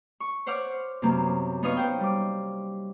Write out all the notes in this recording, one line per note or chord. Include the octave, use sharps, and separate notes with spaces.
C#6
C5 C#5 F#5 D6 F6
F#2 C3 A#3 B3
B3 D#4 C#5 F5 D#6
C5 G5
G3 D6